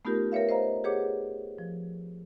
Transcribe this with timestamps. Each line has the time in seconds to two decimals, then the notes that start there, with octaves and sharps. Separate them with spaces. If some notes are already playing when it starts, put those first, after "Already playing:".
0.05 A3 B3 D#4 F4 G4 A#4
0.32 A#4 B4 C#5 E5 F5
0.49 C5 D#5 F5 A#5
0.84 G4 G#4 B4 C#5 F#5 D6
1.58 F3